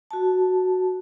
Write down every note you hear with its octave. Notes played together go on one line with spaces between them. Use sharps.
F#4 A5